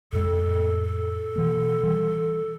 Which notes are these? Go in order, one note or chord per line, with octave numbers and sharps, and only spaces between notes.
F2 A2 G#3 A4
B2 E3 A#3
E3 G3